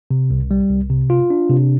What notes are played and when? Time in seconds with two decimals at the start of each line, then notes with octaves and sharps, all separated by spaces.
0.11 C3
0.30 C2
0.51 G3
0.71 C2
0.90 C3
1.10 F4
1.30 D4
1.50 C3